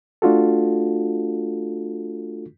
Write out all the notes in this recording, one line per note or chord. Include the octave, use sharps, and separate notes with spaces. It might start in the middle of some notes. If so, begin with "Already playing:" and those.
A3 D4 F4 F#4 A4